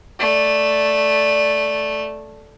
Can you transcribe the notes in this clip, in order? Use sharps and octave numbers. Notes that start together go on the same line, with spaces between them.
A3 D5